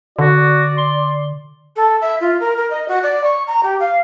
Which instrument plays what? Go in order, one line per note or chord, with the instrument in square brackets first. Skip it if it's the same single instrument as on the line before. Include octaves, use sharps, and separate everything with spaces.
[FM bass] D3 [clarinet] F#4 [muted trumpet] D5
[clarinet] C6
[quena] A4
E5
F4
A#4
A#4
D#5
F#4
D5
C#6
A#5
G4
F5